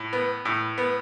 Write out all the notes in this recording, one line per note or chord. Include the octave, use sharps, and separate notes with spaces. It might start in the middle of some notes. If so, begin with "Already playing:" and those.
Already playing: A2
B3
A2
B3